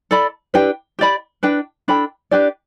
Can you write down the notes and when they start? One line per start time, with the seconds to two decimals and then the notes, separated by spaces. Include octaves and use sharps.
0.11 A4 D5 B5
0.54 D4 G4 B4 G5
0.99 G4 D5 B5
1.43 D4 B4 G5
1.88 D4 A4 G5 B5
2.31 D4 G4 B4 D5